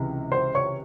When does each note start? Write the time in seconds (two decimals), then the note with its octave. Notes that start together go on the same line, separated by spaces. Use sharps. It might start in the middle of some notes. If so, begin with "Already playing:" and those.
Already playing: C#2 C3 E3
0.32 C5 C6
0.55 C#5 C#6